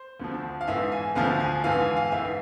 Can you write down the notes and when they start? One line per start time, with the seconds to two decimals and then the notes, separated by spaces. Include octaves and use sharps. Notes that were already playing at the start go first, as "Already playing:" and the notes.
Already playing: C5
0.20 D2 D3 F3
0.61 F5
0.68 G#2 E3 E5
0.92 G#5
1.16 D2 D3 F3 F5
1.40 G#5
1.64 G#2 E3 F5
1.80 G#5
1.96 F5
2.11 G#2 E3 E5